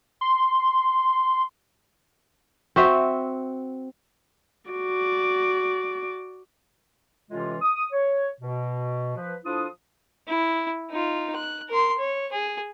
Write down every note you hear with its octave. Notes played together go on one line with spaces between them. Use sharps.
C6
C4 F#4 E5
F#4 D5
A2 C3 E3 G#3 C#4 F4
D#6
C#5
B2
F3 B4
F3 D4 E4 F4 A4 D#6
E4
D#4 F4
F#6
A#4 C6
C#5
G#4